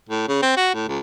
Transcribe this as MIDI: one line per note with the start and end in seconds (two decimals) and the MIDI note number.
0.09 0.24 45
0.28 0.38 49
0.42 0.52 60
0.57 0.69 66
0.74 0.87 45
0.88 1.00 37